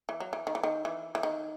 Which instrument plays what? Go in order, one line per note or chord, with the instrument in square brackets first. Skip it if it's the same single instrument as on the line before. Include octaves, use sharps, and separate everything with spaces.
[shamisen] E3
F#3
E3
D#3
E3
D#3
E3
E3
D#3